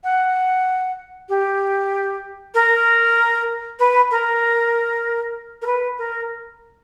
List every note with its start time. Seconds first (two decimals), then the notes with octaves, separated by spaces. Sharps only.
0.04 F#5
1.29 G4
2.54 A#4
3.79 B4
4.11 A#4
5.62 A#4
5.66 B4
5.98 A#4